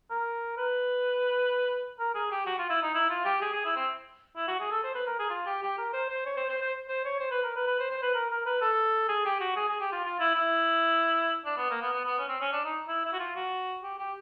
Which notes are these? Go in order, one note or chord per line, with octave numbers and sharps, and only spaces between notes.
A#4
B4
A#4
G#4
G4
F#4
F4
E4
D#4
E4
F4
G4
G#4
G#4
E4
C4
E4
F#4
G#4
A4
C5
B4
A#4
G#4
F4
G4
G4
A#4
C5
C5
C#5
C5
C5
C5
C5
C#5
C5
B4
A#4
B4
B4
C5
C5
B4
A#4
A#4
B4
A4
G#4
G4
F#4
G#4
G#4
G4
F4
F4
E4
E4
D4
B3
A#3
B3
B3
B3
C#4
C4
C#4
D4
D#4
E4
E4
F#4
F4
F#4
G4
G4